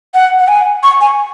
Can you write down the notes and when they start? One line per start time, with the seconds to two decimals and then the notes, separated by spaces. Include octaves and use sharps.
0.14 F#5
0.39 F#5
0.48 G#5
0.83 C#6
1.01 G#5